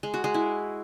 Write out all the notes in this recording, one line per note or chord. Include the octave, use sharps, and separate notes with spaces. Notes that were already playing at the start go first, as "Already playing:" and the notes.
G#3
F#4
G#3
E4